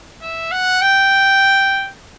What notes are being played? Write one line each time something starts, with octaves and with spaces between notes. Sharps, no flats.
E5
F#5
G5